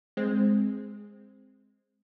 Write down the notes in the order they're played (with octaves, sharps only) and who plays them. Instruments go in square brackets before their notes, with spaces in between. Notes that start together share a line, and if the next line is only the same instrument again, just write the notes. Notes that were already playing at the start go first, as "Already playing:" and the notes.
[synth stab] G#3 C4